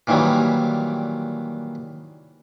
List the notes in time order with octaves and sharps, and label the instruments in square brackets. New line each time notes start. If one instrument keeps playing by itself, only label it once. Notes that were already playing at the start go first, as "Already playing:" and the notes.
[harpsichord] A#2 D#3 E3 F#3 G3